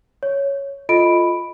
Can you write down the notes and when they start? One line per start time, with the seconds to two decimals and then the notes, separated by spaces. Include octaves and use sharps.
0.23 C#5
0.89 F4 A4 D#5 B5 D7